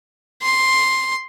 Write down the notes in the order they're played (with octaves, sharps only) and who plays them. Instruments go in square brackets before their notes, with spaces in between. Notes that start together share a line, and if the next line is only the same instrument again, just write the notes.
[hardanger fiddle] C6